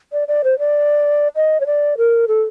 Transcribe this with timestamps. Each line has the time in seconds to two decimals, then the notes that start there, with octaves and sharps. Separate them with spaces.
0.13 D5
0.28 D5
0.44 C5
0.59 D5
1.36 D#5
1.61 C#5
1.66 D5
1.98 A#4
2.28 A4